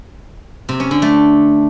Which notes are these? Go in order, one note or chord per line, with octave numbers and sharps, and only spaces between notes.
C3
C#4
D3
A3